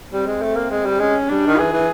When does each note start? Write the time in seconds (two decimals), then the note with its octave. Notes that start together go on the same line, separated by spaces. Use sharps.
0.12 G3 C4
0.26 G#3
0.42 A3
0.56 A#3
0.70 G#3
0.85 G3
1.00 G#3 C#4
1.29 G3 D4
1.47 D#3
1.58 E3 G#4
1.72 E3